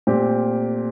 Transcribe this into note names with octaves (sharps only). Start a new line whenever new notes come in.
A#2 A3 C4 G4